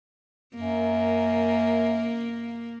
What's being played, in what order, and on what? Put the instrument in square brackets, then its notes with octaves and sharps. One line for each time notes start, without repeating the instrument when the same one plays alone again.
[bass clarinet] F#2 [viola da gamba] A#3